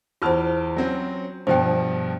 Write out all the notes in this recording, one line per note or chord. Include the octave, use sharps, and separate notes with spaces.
E2 F4 C5 A5 F6
F#3 C4 C#4
G2 B2 F3 C5 G5